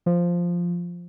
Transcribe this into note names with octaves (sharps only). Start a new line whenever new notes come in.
F3